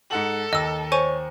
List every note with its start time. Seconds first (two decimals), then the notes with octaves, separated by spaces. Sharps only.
0.11 G#2 A4 F#5 F#7
0.53 D#2 D#5 E6
0.92 C5 C#5 G#5